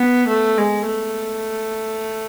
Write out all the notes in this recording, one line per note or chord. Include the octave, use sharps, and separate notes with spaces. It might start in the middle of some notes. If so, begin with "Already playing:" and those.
Already playing: B3
A3
G#3
A3